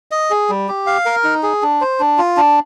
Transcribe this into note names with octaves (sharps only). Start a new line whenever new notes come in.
D#5
G#4
G3
G4
F5
A#4
D#4
G#4
D4
C5
D4
F4
D4